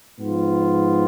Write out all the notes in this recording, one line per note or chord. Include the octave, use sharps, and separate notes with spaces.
G#2 F3 B3 F4